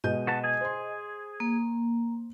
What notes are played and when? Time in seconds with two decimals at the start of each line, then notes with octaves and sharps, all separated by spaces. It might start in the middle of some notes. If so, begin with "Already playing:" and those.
0.04 B2 G#3 D#5 G6
0.27 F#4 B4 A5
0.44 G#4 G#5
0.61 C5 C6
1.40 A#3